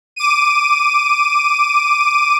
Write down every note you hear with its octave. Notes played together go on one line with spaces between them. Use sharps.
D6 D#7